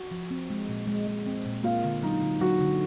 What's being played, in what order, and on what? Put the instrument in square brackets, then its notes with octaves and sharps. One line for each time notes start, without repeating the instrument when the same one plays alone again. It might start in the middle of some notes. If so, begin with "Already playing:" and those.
Already playing: [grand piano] F#4
[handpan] F3
C4
G#3
A#2
G#3
G#3
C4
A#2
[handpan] A#3 [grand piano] F4
[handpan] D3
[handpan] F#3 [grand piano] D#4
[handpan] D3
[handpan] F#3 [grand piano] F#4
[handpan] D3